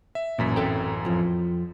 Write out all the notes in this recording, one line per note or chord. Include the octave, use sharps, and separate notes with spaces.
E5
A1 F#2 A#2 B6
C4 A4 G5
F2 F3